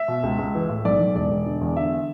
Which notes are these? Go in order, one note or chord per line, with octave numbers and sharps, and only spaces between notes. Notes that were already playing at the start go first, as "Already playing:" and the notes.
Already playing: E5
B2
C#2
C#2
E3
A2
B1 D5
B1
E1 D5
E1
D3
E2
D3 E5